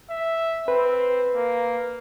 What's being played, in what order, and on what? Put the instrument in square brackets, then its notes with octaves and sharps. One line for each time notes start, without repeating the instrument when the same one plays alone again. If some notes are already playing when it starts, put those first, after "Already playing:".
[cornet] E5
[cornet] C4 [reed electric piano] B4
[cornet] A#3